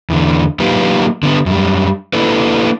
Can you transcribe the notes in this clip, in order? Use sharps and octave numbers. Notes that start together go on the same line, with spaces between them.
E2 D3
F#3 A#3 D#4 F4 G4 B4
D3 B3
F#2 G3
A#3 D4 E4 A4 B4